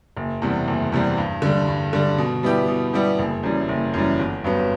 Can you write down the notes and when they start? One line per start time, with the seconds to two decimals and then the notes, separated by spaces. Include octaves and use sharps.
0.17 F#1
0.42 E2 C3 G3
0.68 F#1
0.92 E2 C3 G3
1.18 G2
1.42 D3 G3
1.68 G2
1.93 D3 G3
2.18 B2
2.43 G3 B3 E4 G4
2.68 B2
2.93 G3 B3 E4 G4
3.19 F#1
3.43 F#2 E3 G3
3.69 F#1
3.94 F#2 E3 G3
4.19 G1
4.44 G2 F#3 B3